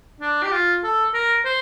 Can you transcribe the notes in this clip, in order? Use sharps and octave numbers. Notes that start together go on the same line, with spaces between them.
D4
G4
F4
A4
A#4
C5